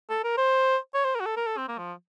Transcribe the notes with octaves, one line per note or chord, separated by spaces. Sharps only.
A4
A#4
C5
C#5
C5
A#4
F#4
A4
A#4
A4
C4
A#3
F3